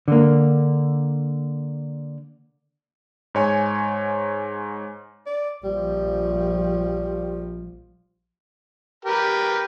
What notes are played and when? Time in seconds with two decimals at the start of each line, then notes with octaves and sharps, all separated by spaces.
0.08 D3 A#3
3.35 G#2 C#5 G#5
5.26 D5
5.64 A#1 F3 G3
9.05 G4 A#4 B4